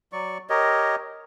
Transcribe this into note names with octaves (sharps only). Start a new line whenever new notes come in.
F#3 D5 C#6
G4 A#4 C#5 D#5